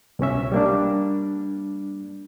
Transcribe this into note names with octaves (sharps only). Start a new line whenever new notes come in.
C2 B2 C#4 E5
G3 A#3 D4